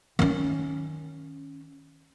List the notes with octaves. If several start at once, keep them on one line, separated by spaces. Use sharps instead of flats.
D#3 C#4